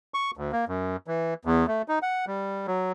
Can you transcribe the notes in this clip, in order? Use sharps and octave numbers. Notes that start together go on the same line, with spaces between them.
C#6
D2
A#3
F#2
E3
E2
A3
D#4
F#5
G3
F#3